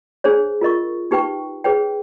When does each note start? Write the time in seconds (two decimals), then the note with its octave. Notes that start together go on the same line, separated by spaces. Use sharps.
0.24 D4 G#4 C5 C#5
0.61 F4 A#4 D#5 C#6
1.11 D#4 G4 B4 G5 C#6
1.64 G#4 B4 C#5 G5